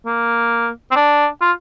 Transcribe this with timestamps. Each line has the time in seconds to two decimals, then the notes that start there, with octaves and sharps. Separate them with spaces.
0.06 A#3
0.91 C4
0.96 D4
1.41 F4